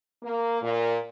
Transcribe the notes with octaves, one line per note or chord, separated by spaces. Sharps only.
A#3
A#2